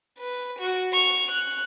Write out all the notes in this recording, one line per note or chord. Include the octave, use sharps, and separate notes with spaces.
B4
F#4
C#6 F7
F#6